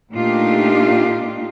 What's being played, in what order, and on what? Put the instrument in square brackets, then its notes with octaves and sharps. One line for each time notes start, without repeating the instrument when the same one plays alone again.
[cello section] A#2 A3 D4 D#4 F4 G4